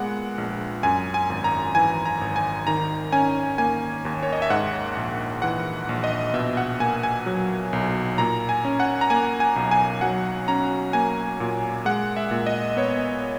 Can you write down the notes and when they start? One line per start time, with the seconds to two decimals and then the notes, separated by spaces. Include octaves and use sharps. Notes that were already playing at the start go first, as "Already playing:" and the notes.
Already playing: A#2 G#3 B3 F#5
0.38 A#1
0.83 F#2 G#5
1.14 G#5
1.30 G#1
1.44 A#5
1.75 E3 G#5
2.06 A#5
2.21 G#1
2.36 G#5
2.67 D#3 A#5
3.12 C#4 G#5
3.58 A#3 G#5
4.05 D#2
4.23 C#5
4.33 D#5
4.42 E5
4.50 G#2 F#5
4.97 A#1
5.42 E3 F#5
5.89 A#1
6.04 D#5
6.34 B2 E5
6.57 F#5
6.80 A#3 G#5
7.03 G#5
7.26 F#3
7.73 B1
8.18 A#2 A#5
8.49 G#5
8.65 C#4
8.80 F#5
9.01 A#5
9.10 A#3 G#5
9.40 G#5
9.56 B1
9.71 G#5
10.01 F#3 F#5
10.48 C#4 A#5
10.93 A#3 G#5
11.40 A#2
11.85 G#3 F#5
12.17 E5
12.31 A#2
12.46 D#5
12.77 B3 C#5